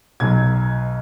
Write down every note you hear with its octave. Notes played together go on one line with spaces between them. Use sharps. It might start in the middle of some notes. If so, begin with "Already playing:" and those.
B1 B2 F#3 G#6